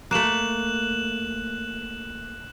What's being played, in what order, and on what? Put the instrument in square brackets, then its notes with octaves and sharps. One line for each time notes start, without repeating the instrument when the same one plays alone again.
[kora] A3 A#3 [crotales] F#6 E7 F#7